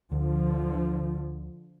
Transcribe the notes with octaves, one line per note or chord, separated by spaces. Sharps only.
D2 D3 F3